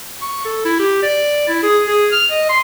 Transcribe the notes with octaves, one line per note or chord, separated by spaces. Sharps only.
C#6
A4
E4
G4
D5
E4
G#4
G#4
F6
D#5
C6